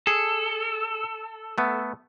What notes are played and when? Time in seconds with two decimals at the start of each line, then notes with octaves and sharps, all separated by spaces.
0.07 G#4 A4
1.58 A3 B3